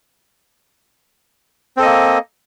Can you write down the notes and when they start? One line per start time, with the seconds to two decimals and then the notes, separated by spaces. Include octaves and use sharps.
1.77 C4
1.80 A4
1.82 D#5
1.85 A#3